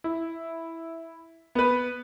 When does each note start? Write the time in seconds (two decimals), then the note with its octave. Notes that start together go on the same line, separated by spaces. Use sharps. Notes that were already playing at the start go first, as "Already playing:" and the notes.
0.04 E4
1.55 B3 B4